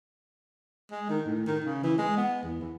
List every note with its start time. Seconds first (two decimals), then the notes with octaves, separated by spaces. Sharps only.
0.91 G#3
1.10 D#3
1.26 A2
1.46 D#3
1.64 C#3
1.84 E3
1.98 G#3
2.17 B3
2.43 E2
2.61 E3